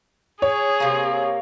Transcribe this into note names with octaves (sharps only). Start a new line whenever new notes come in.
G#4 C#5
C3 A#3